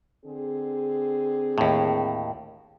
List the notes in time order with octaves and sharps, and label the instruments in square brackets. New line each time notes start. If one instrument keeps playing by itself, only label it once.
[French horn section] D3 C4 G#4
[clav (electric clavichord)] D#2 A2